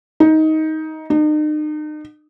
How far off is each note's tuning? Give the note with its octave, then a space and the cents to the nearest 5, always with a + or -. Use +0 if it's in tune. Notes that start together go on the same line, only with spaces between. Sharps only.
D#4 +15
D#4 -40